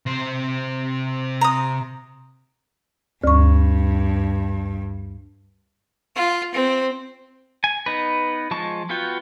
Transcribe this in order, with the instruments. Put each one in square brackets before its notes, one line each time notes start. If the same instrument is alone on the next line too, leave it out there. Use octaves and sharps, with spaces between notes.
[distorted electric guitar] C3 C5
[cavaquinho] A#5 D#6
[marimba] D2 C#6 [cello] G2
[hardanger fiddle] F4
C4
[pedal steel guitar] G#5
B3 D#4 B4
F3 G#3 A5 C#6
B3 F4 F#4 G5